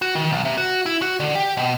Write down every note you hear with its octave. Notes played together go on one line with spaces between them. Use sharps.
F#4
D#3
B1
C3
F#4
E4
F#4
D3
G4
B2